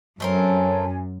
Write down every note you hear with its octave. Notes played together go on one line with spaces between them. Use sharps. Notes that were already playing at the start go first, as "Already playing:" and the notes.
F#2 A3 C4 A#4 C#5 G#5